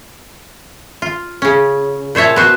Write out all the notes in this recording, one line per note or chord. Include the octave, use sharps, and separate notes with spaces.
F4
C#3 C#4
A#2 C5 C#5 E5 A5
B3 F#4 C5